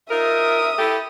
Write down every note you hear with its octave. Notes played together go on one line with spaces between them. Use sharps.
D#4 F4 A#4 E5 D#6
E4 G4 A4